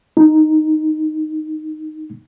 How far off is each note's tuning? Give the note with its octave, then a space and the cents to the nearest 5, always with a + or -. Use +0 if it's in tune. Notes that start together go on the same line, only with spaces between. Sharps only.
D#4 -5